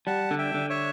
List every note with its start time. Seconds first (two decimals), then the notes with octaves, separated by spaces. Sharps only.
0.07 G3 F#5 A5
0.31 D3
0.38 E5 G5
0.54 D3
0.70 C#5 E5